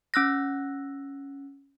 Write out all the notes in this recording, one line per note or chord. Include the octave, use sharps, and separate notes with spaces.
C#4 E6 F#6 A#6